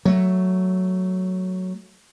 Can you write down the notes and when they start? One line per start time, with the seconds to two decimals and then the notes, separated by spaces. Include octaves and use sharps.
0.05 F#3 A3